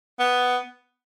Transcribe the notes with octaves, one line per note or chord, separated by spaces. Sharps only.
B3